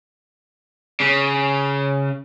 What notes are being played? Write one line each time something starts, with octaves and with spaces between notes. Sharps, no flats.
C#3